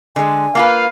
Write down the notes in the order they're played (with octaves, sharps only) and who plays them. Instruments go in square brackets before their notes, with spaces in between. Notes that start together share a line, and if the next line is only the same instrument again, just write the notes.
[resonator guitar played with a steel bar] D3 G#3 [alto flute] G#5
[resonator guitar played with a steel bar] A#3 F4 B4 [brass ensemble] F5